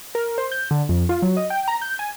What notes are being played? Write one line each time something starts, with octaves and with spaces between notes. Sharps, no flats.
A#4
C5
G6
D3
F2
F4
F#3
D#5
G5
A#5
G6
G#5